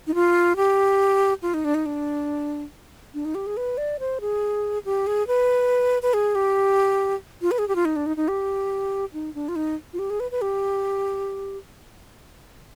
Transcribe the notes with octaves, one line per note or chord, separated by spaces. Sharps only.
D#4
F4
G4
F4
D#4
D4
D#4
D4
D4
D#4
G4
G#4
B4
D5
C5
G#4
G4
G#4
B4
B4
G#4
G4
F4
B4
G#4
G4
F4
D#4
D4
D#4
D#4
G4
D#4
D4
F4
D#4
F4
G4
G#4
B4
B4
G4